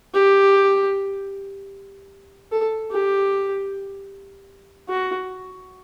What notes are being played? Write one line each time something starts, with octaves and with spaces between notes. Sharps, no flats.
G4
A4
G4
F#4